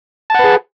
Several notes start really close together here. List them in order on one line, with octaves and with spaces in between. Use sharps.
A5 F#5 B4 G#4